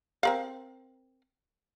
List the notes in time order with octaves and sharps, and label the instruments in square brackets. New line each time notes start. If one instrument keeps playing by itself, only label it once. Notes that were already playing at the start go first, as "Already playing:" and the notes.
[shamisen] C4 A#4 F5